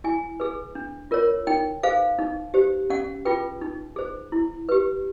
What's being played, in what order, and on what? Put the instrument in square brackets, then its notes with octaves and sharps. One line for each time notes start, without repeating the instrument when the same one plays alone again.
[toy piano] E4 G#5
G#4 B4
D4
F4 A#4 C#5
D#4 G5
G#4 C5 F5
D#4
G4 C5
C#4 F#5
F4 G#4 B4 G5
D#4
G#4 C5
E4
G4 B4